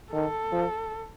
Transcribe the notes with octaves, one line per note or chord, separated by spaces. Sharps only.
D#3 A4
F3